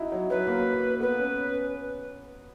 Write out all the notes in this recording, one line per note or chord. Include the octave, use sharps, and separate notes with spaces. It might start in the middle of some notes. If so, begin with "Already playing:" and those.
Already playing: D#4 E4 F#4
F#3
F#3 B4
A#3
B3 B4
C#4